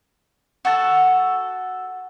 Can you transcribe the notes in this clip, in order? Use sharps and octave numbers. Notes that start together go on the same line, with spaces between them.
F#4 A4 A5